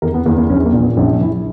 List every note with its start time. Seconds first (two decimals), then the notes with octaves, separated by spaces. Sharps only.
0.02 E2 A#4
0.14 B3
0.26 E2 A#3
0.38 A#3
0.50 A#1 C#4
0.66 A#3
0.73 A#2
0.81 B3
0.97 A#1 C#4
1.21 A#1 E4